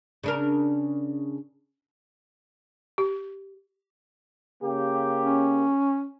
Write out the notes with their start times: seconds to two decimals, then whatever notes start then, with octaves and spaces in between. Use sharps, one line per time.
0.23 C#3 D4 A#4
2.98 G4
4.63 C#3 A#3 G4
5.22 C#4